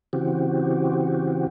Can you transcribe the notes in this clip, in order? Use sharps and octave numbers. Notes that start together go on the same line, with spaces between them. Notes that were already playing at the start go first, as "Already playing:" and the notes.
C#3 E3 C4 F#4 G4